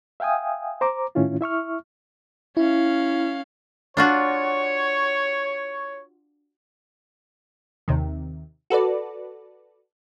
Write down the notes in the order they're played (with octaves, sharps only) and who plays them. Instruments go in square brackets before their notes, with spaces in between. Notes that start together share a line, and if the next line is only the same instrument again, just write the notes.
[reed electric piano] E5 F5 G5 G#5 D#6
C5 A#5 D6
A2 D#3 C#4 E4 F4
E4 E5 C#6 F6
[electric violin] C#4 F5 [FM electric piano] E4
[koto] D4 F4 F#4 [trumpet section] C#5
[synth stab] D#2 C3 D#3
F#4 A4 B4 D5